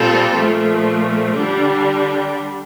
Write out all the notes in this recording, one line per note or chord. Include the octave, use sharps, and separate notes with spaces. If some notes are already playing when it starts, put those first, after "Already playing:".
Already playing: A#2 G3 C4 F4 A4
A#2 F3 A3
D3 G3 D4